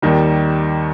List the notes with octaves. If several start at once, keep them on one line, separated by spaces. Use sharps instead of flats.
D#2 D#3 G3